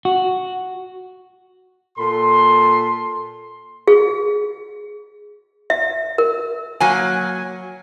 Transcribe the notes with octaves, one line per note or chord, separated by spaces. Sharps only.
F#4
A#2 A4 C6
G#4
E5
A#4
F#3 A#3 G#5